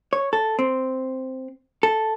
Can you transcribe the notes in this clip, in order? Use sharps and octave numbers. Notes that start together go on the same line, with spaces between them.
C#5
A4
C4
A4